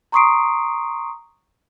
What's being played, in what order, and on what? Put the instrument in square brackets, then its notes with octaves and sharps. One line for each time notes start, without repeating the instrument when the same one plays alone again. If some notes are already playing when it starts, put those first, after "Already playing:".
[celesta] A#5 C6 C#6 D#6 C7 D7